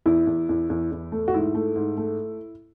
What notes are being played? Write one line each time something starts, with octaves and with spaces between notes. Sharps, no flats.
E2 E4
E2
E2
E2
E2
A3
F#4
G#2 E4
A3
G#2
A3